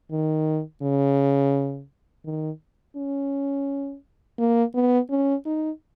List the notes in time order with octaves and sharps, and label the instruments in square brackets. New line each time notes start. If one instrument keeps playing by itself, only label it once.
[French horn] D#3
C#3
D#3
C#4
A#3
B3
C#4
D#4